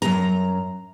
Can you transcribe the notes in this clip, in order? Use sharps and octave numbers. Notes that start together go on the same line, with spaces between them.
F#2 A#5